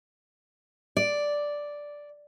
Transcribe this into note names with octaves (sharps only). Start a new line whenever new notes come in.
D5